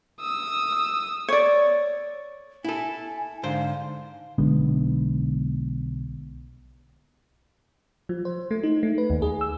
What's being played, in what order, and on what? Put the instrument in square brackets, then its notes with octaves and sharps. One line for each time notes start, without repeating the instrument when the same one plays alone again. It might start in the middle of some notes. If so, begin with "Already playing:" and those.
[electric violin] D#6 E6
[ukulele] C#5 D5
[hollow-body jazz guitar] E4 A4 [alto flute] G#5
[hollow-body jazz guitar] G#2 D3 C5 [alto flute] F5
[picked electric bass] B1 D3 G#3 B3
[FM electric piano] F3
C5
A3
D#4
A3
B4
D#2
G#4
E6